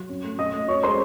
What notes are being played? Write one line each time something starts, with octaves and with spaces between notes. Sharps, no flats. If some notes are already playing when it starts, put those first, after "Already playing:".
Already playing: F#3
C#4
A3
C#4 D#5 D#6
A3
C#4 C#5 C#6
G#3 C5 C6